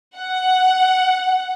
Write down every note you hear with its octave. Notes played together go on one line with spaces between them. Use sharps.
F#5